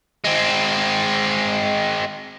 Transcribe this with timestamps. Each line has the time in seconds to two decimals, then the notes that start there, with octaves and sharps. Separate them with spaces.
0.24 G#3 C4